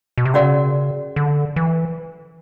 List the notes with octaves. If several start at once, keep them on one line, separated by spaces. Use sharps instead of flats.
B2
C3
C#3 C#4 F#4 A#4 D5 F#5
D3
E3